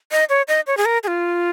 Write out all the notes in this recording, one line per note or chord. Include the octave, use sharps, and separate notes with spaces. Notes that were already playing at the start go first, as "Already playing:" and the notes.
D#5
C#5
D#5
C#5
G#4
A#4
G#4
F4